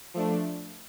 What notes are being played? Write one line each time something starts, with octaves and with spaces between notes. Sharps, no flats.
F3 A3 D4